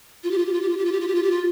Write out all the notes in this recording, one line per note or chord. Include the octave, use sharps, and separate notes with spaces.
F4
G4
F4
G4
F4
G4
F4
G4
F4
G4
F4
G4
F4
G4
F4